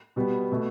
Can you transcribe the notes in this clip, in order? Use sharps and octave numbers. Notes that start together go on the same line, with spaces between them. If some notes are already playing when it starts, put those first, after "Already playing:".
B2 G3 B3
B2 A3